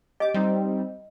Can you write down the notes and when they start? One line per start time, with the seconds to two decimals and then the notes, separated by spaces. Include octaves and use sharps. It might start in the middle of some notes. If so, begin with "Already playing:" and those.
0.20 G4 D#5 D6
0.34 G3 C4 D#4